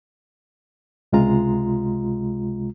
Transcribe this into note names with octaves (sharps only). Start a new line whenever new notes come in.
C#2 C3 G#3 F4 A#5